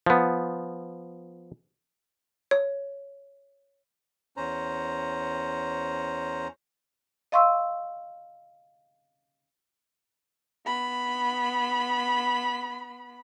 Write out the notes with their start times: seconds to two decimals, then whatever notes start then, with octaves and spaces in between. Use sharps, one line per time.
0.06 F3 B3
2.51 C#5
4.37 E2 C#4 C5 A#5
7.32 D#5 F5 C6 C#6 E6
10.66 B3 B5